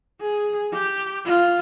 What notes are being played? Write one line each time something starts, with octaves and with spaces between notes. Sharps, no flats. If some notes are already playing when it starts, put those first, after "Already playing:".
G#4
G4
F4